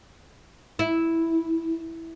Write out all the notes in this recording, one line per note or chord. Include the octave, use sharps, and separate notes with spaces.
E4